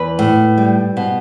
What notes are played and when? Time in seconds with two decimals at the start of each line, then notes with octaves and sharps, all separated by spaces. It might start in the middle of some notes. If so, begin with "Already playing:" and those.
Already playing: E2 B4
0.19 A2
0.58 G3
0.97 B2